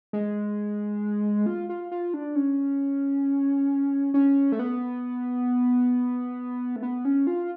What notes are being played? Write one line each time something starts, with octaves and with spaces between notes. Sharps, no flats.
G#3
F4
F4
F4
D4
C#4
C#4
A3
B3
A3
B3
C#4
F4